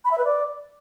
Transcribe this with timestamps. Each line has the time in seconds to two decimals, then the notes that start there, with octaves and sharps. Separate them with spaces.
0.05 B5
0.11 E5
0.18 B4
0.25 D5